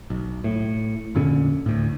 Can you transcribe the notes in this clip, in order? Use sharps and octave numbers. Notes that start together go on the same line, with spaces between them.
B1
A2
F2 A#2 D3 C#4
D2 A2